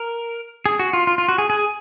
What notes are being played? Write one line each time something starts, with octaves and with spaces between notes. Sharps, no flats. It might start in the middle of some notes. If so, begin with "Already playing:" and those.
Already playing: A#4
G#4
F#4
F4
F4
F4
F#4
G#4
G#4